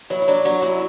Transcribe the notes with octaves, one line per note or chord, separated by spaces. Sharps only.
F#3 E4
E4
F#3 D4
F#3 F#4
F#2 E4